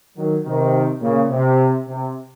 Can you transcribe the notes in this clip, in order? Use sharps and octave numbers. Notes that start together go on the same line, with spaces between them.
D#3 F#3
C3 D#3
A#2 C#3
C3
C3